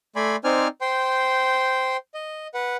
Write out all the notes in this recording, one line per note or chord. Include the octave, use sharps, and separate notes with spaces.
A3 D5 G#5 B5 C6
C4 D#4 C5 D5 G#5 F6
C5 G5 C6
D#5
B4 F#5